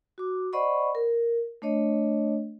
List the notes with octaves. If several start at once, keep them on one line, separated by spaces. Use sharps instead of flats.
F#4 D6
C5 D5 D#5 F#5 B5 C#6
A#4
A3 D4 C#5 D#5